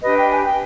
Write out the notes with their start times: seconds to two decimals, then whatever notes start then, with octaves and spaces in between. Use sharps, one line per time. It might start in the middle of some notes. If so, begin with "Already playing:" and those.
0.02 D4 G4 B4 D#5
0.17 G5
0.30 G#5
0.44 G5